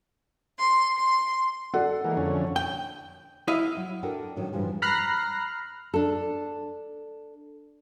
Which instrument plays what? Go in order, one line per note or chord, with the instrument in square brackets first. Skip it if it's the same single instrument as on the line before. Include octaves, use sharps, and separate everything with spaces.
[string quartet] C6
C6
[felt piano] A4 D5 F#5
[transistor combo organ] E3 G#3 A#3
F2 D3 C#4
[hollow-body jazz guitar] G5
E4 D#5 F5
[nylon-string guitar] F#3
D4 E4 F#4 A4 A#4 G5
A2 D#3 F#3 A3 C#4
G2 C#3 E3 F3 G3 G#3
[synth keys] A#5 B5 F6 F#6 A#6 C7
[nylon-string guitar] D4 A4